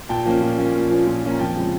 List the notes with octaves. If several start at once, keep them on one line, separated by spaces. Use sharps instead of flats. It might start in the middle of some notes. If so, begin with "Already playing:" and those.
A#2 G5 A5
F3 A#3 C#4
A#2
F3 A#3 C#4
A#2
F3 A#3 C#4
A#2
F3 A#3 C#4
A#5
F2 G5 A5
C#3 F3 G#3